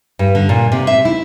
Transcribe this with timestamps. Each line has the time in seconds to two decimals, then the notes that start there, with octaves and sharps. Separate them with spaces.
0.19 G2
0.35 D3
0.49 A#2
0.72 C3
0.87 E5
1.05 E4